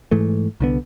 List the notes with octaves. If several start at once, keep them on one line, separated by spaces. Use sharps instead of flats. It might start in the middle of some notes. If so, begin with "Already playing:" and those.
G#2 E3 A3
C2 D3 B3